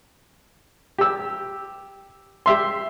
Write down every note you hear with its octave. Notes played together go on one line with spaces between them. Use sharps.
G4 E6
G4 E5 C6